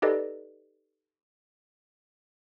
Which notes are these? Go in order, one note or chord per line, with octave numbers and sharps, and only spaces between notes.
D#4 G4 A4 B4 D5 D#5